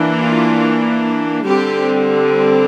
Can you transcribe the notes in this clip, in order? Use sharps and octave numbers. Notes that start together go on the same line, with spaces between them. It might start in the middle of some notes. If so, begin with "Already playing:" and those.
Already playing: E3 A#3 D4
F4
D3 G3 C4 G4